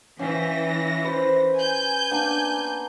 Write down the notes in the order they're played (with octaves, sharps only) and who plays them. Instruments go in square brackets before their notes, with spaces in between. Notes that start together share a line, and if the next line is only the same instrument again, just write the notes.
[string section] E3 A#6 [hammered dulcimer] C#4 F5 G5
[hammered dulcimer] B4 C5
[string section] G#5 G6
[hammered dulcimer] A#3 B3 D4